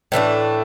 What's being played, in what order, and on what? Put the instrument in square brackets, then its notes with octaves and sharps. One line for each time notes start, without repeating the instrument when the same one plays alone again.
[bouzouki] A2 E3 A3 D4